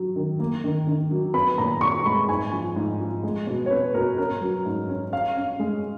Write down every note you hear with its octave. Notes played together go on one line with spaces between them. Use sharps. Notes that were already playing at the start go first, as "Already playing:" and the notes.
Already playing: F#3
D#3
A#3
D#3
D#3
F#3
B3 B5
A#2 A#5
A#2 C#6
G#3 B5
G#2 G#5
F3
G#2
F3
G#3
B2
C#5
B3 B4
B2 A#4
C#4 A#4
F#3
G#2
C#4
C#4 F5
C#4
G#3